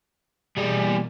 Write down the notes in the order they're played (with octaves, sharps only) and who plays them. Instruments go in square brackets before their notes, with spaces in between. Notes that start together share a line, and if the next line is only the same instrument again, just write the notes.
[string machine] B2 E3 A#3 [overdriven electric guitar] G3 G#4